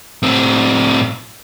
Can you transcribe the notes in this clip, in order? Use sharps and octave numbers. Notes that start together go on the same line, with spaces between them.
A2 C4